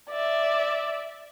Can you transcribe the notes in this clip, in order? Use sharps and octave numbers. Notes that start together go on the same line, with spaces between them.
D5 E5